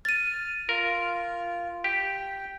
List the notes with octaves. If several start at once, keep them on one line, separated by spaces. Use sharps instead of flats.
F6 A6 D#7
F4 A#4
G4 G5